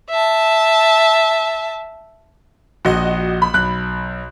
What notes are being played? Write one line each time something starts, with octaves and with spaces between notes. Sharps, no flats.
E5 A5
A#1 F#4 D#5
B5
B1 F#6